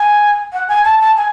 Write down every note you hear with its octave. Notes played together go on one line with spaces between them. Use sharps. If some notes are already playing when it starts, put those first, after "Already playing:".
Already playing: G#5
F#5
G#5
A5
A5
G#5